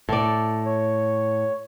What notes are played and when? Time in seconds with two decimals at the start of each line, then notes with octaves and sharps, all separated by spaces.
0.09 A2 A4 D5
0.66 C#5